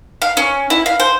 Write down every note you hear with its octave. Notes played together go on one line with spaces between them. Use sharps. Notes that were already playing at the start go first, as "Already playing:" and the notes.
F5
C#4
E4
F5
C5